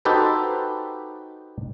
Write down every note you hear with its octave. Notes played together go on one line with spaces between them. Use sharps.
D#4 F#4 G4 A4 B4 C5